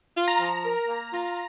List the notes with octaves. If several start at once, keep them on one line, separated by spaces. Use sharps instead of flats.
F4
A#5
F3
A#4
A#3
F4